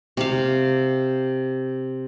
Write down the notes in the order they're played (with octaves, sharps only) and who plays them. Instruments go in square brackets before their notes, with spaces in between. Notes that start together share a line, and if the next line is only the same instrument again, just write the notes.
[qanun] C3 F5